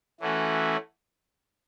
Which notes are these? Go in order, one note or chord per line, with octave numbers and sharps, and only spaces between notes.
E3 A3 C#4 F#4